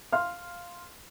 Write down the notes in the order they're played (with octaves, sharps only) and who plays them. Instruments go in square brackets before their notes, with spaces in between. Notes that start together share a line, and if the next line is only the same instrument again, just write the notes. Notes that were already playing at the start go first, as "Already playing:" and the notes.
[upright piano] F5 C6 F6